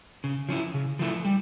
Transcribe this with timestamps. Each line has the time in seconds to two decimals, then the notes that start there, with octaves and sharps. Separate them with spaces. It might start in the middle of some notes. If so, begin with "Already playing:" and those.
0.24 C#3
0.49 F3 C#4 E4
0.74 C#3
0.99 F3 A3 E4
1.25 G3